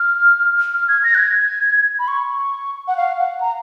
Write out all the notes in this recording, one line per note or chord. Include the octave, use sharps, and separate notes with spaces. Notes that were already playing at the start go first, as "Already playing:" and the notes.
Already playing: F6
F6
G#6
A#6
F#6
G#6
B5
C#6
F#5
F5
F#5
A#5